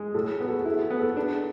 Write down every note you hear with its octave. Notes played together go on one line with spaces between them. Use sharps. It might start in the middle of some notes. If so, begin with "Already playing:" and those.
Already playing: G#3
A2 F#4 A4
G#4
B3
F#4 A4
G#4
E4 F#4 A4
G#4
B3
F#4 A4
D4 G#4 B4